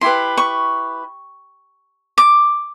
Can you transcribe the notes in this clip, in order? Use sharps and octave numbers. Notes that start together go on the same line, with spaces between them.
E4 G4 B4 C6
C#6
D6